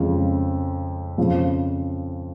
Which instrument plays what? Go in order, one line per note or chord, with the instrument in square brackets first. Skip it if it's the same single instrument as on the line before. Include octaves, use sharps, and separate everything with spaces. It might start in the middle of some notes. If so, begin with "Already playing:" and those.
Already playing: [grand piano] F2 C#3 G#3 F4
F2 C#3 F3